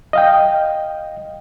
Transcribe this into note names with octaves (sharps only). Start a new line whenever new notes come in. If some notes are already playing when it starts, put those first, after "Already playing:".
D#5 F5 G5